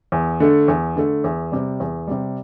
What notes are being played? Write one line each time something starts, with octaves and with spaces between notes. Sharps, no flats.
E2
D3 A3
E2
D3 A3
E2
C3 G3
E2
C3 G3